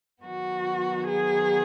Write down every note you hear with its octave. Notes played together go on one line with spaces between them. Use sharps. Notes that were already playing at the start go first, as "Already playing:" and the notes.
D#3 F#3 B3 F#4
G#4